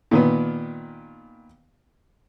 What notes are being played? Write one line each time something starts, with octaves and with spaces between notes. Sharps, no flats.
A#2 D#3 B3